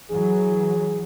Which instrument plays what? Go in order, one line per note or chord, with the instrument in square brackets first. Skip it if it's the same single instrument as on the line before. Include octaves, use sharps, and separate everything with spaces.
[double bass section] E3 F#3 [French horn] G#4